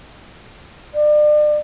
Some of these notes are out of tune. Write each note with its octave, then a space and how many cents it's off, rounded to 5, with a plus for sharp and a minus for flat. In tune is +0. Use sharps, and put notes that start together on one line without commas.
D5 +35